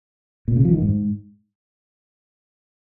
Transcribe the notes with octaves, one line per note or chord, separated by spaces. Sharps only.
A#2
C#3
F3
D#3
G#2